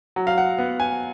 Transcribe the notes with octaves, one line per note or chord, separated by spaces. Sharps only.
F#3
F5
F#5
B3
G#5